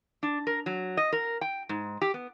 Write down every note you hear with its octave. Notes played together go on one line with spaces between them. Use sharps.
D4
A#4
F#3
D#5
A#4
G5
G#2
G4
B3